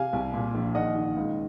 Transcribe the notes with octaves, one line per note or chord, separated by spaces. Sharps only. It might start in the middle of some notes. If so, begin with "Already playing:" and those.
Already playing: C3 F5 G#5
C2
A#2
A#1
D#3 D#5 F#5
D#3
C#2